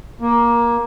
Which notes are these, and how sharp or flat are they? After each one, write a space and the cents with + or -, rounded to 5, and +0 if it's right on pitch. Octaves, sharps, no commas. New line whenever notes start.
A#3 +15